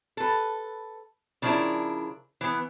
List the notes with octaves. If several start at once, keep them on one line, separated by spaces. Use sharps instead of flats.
A4 B4
C#3 F3 C#4 D4 E4 A#4
E3 B3